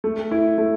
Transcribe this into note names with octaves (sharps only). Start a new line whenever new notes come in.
A3
E4
A3